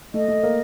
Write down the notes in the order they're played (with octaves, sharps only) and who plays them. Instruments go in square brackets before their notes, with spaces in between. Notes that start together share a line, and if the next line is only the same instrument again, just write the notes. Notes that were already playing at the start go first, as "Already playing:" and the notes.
[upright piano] A3 [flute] D#5
[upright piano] A3
A#3